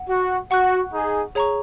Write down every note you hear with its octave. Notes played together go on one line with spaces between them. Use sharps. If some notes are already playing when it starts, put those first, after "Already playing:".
Already playing: F#5
F#4
F#4 F#5 C#6 F#6
D#4 G#4
G#4 C#5 A#5 C#6